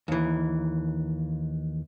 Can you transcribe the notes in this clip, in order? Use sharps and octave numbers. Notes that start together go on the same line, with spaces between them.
D#2 E3